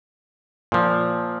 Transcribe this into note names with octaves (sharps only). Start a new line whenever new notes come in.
A#2 F3